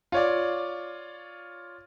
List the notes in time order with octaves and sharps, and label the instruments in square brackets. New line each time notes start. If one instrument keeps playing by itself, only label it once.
[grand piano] F4 C#5 D5